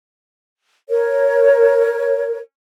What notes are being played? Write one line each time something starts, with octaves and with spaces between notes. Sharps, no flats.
A#4 C#5